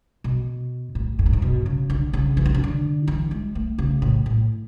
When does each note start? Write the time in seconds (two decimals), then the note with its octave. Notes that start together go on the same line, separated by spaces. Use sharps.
0.24 B2
0.95 A2
1.19 G#2
1.26 A2
1.33 G#2
1.42 B2
1.66 C#3
1.90 D3
2.13 C#3
2.37 E3
2.46 D3
2.55 C#3
2.64 D3
3.08 E3
3.31 G#3
3.55 A3
3.78 C#3
4.02 A2
4.26 A2